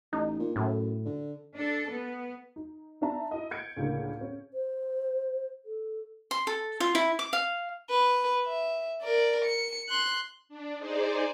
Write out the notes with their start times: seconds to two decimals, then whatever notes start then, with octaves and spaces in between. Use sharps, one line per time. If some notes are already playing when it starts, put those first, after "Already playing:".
0.13 A1 D#4
0.40 A#2
0.56 F#2 A2
1.05 D3
1.55 D4 A4
1.91 B3
2.56 D#4
3.01 B3 D4 D#4 E5 A5 A#5
3.31 E4 D#5
3.51 G6 G#6 C#7 D7
3.77 C#2 A2 D3 A#3
4.21 C#4
4.52 C5
5.65 A4
6.31 C6
6.47 A4
6.80 F4
6.95 E4
7.19 D6
7.33 F5
7.90 B4
8.46 E5
9.02 A#4 D5
9.45 C#7
9.89 C6 F#6
10.49 D4
10.78 D#4 G#4 C5 D5